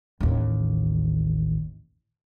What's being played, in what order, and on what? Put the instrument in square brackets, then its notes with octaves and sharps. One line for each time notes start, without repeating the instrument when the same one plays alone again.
[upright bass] A1 D#2